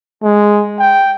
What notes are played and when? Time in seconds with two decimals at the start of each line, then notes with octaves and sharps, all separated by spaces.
0.23 G#3
0.79 G5